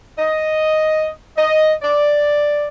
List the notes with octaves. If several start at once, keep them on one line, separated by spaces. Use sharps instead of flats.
D#5
D#5
D5